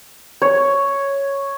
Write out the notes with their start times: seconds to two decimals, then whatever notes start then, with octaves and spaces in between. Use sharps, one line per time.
0.42 C#5